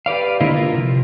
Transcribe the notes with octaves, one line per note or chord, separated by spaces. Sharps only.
G4 B4 D5 F5
D3 A#3 E4 F4 C5 D#5
F4 A#4
C3 F3